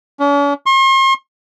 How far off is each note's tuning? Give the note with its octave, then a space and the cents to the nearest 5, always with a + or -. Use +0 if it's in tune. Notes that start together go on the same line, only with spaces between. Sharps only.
C#4 +45
C6 +45